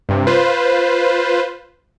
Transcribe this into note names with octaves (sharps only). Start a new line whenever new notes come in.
G2 C3
F4 B4 C5